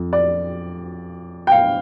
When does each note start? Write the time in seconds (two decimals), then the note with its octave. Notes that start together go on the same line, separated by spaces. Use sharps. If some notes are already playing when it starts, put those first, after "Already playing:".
Already playing: F2
0.13 D5
1.47 G5
1.52 F5